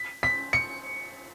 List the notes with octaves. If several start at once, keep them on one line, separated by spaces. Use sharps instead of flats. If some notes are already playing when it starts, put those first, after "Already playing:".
Already playing: B6
B6
C#7